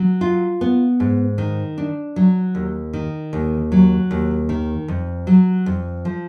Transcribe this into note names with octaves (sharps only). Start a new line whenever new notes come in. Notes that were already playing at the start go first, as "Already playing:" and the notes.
Already playing: F#3
F4
B3
G#2
D#3
D4
F#3
D#2
D#3
D#2
F#3
D#2
D#3
F2
F#3
F2
F3